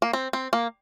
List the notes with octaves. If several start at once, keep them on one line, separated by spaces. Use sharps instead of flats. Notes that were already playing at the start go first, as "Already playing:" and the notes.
A#3
C4
C4
A#3